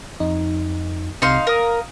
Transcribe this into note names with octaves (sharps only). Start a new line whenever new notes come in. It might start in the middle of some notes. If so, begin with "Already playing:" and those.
F2 D#4
C2 C3 D#4 F5 C6
A#4 F5 D#6